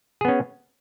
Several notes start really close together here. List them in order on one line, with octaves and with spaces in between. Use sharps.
G#4 B3 C#4